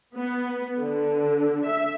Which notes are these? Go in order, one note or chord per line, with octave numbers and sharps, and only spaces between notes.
B3
D3
E5